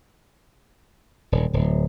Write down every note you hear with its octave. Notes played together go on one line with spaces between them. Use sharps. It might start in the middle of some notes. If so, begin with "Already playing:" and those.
D#1
D1